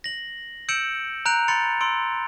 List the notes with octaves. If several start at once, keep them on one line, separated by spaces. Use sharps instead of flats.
A#6 F#7
E6 G6 C#7 D7 E7 F#7
A#5 F#6 G6 D7 F7
B5 C6 F#6 A6 C#7 F7
C6 E6 D7